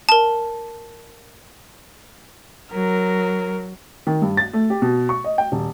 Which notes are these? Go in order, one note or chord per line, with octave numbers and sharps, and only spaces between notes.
A#4 A5
F#3 A#4
D#3
G2
A6
A3
G4
B2
C#6
D#5
G5
D#1